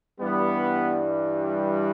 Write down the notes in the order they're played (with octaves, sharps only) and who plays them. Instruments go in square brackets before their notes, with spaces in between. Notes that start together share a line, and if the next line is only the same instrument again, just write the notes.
[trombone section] G2 E3 G3 [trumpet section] B3